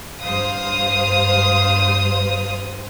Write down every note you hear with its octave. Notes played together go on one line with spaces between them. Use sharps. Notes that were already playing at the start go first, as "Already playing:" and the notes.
G2 C5 F5 D#6